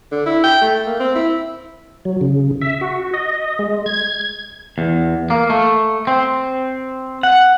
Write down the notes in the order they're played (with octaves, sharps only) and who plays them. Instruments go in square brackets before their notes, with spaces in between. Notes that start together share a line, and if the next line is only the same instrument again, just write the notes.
[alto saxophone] D3
E4
G5
A3
A#3
C4
E4
[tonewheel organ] F#3
C#3
E5
F#4
D#5
G#3
G#6
[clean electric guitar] E2
A#3
A3
C4
F#5